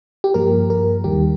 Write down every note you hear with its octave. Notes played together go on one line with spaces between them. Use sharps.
G4
G2 F3 A#3 A#4
A#4
D#2 D#3 G3 G4